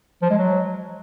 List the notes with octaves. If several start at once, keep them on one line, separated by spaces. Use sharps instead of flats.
F3
G#3
F#3